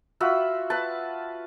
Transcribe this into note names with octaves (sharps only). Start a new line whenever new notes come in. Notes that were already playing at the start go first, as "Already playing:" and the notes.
F4 F#4 E5 B5
B4 A5